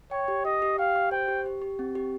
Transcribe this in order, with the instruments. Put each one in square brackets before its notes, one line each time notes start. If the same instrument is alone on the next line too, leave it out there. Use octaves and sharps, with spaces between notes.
[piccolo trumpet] C#5 [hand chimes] G5
[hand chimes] G4
[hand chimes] G4 [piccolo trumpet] D#5
[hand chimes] G4
[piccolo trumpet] F5 [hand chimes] G5
[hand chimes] G4
[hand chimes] C5 [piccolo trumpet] G5
[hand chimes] G4
G4
G4
C4
G4